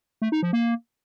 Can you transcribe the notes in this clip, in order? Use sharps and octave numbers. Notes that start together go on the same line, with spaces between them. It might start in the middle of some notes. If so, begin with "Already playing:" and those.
A3
D#4
F3
A#3